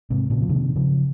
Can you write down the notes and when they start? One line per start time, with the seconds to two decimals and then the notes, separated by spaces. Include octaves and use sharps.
0.10 G#2 C3
0.30 A#2 C#3
0.42 F3
0.49 C3 D#3
0.75 C#3 F3